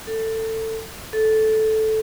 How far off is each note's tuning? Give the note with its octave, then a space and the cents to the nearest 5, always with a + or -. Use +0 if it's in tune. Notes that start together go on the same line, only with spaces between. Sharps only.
A4 +20
A4 -10